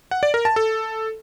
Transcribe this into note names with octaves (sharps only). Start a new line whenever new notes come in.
F#5
D5
A#4
A5
A4